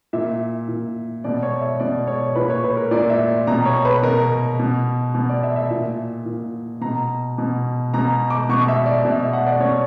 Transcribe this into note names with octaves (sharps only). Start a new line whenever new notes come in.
A#2 E5
A#2
B2 D5
C#5
E5
B2 D5
C#5
A#2 B4
C#5
B4
A#4
A#2 D5
E5
B2 A#5
C#5
B4
B2 A#4
B2
B2
D5
E5
E5
A#2
A#2
B2 A#5
B2
B2 A#5
D6
B2 C#6
E5
D5
B2 E5
E5
F#5
D5
B2 C#5